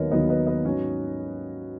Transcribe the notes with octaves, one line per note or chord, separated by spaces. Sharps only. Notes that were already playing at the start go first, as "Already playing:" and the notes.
Already playing: D#2 D#3 F#3 B3 A#4 B4 C#5 D#5
D#2 D#3 F#3 B3 B4 D#5
B4 D#5
B4 D#5
G#2 F#3 C#4